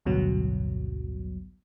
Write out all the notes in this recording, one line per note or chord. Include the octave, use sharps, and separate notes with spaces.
A1 D2 G2 B2 F#3